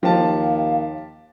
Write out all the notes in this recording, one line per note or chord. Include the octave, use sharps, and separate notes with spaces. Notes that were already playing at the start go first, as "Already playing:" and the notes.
D#2 F3 G4 F5 A5